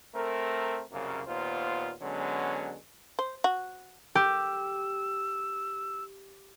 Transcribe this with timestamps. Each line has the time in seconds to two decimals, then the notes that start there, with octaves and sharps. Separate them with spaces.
0.15 A3 C4 A#4
0.92 C2 F#2 C#3 A#3
1.27 D#2 A#2 B3 F4 C5
2.02 D3 F#3 G#3 B3 C#4
3.19 C5
3.44 F#4
4.15 G4 E6